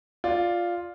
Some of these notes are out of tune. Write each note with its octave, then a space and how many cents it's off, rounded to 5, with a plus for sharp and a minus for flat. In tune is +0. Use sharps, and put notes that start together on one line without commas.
F4 +0 D5 +0